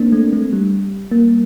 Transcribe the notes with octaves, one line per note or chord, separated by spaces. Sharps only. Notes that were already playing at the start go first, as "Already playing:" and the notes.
Already playing: A#3 C4 D4
A3
A3
G3
A#3